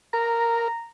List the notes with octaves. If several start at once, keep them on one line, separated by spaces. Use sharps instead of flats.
A#4 A#5